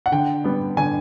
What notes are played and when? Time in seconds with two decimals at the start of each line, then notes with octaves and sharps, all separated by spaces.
0.06 F#5
0.12 D3 G5
0.44 G3 B3
0.77 D3 G#5